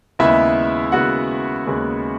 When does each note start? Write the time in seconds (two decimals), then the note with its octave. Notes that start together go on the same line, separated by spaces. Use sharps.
0.19 D#2 C#3 G#3 B3 E4 E5
0.92 D#2 C#3 G#3 B3 F#4 F#5
1.66 D#2 C#3 G#3 B3